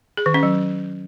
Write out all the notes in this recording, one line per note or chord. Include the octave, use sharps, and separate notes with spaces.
G#4
D#3
C#4
F#3